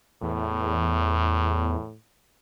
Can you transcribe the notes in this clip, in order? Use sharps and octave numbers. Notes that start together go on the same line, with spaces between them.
E2 A2